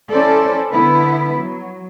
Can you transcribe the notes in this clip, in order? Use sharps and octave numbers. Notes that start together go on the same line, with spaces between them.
C#4 E4 A4 C5 D5
D3 B3 E4 B4
F#3